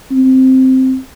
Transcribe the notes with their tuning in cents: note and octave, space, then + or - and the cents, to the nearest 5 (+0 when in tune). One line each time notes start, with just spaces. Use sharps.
C4 +0